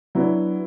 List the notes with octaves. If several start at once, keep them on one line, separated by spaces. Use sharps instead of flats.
F#3 B3 D4 E4